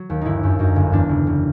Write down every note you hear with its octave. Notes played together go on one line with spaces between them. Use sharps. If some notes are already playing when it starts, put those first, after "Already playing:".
Already playing: F#3
D#2
G1 D#4 E4
F#2
F#2 D#4
G1
E2 D4
F#1
F#1